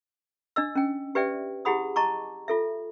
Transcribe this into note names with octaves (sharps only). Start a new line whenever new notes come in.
D4 D#5 E6
C#4 G5
G4 B4 D5 E5 G5
E4 G4 G#4 F#5 B5 D#6
D#5 A5 A#5 C#6 D6
F4 A4 E5